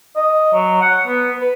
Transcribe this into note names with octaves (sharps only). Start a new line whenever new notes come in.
D#5
F#3
F#5
B3
B4